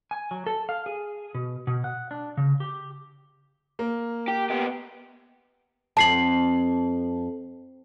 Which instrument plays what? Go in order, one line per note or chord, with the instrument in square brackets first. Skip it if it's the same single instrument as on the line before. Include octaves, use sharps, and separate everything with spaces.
[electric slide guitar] G#5
F#3
A4
F5
G#4
B2
B2
F#5
D4
C#3
G4
[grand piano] A#3
[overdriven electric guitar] G4
B3 G4
[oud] F2 [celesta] A5 C7 F#7